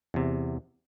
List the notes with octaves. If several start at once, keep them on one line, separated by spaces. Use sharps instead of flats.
E2 C3